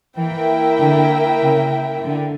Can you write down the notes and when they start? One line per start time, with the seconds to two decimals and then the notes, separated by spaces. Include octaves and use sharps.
0.17 E3 A#3 E4 A#4 E5 G5
0.80 D3
1.41 C#3
2.03 D3